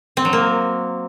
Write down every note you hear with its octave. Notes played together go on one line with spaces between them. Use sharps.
C4
F#3
A#3